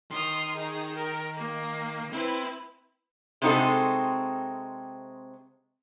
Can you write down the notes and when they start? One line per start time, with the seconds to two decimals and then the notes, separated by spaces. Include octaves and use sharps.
0.11 D#3 C6 D#6 F6
0.56 D#4 G#4
0.95 A#4
1.36 A#3
2.12 C4 E4 B4 C5 B5
3.42 C3 G#3 C4 D#4 F#4 A4